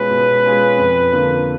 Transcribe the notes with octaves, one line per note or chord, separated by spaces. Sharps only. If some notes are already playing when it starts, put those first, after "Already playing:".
Already playing: B2 G#3 C#4 F4 G#4 B4
B2
G#3 C#4 F4 G#4
F2
D3 F3 A#3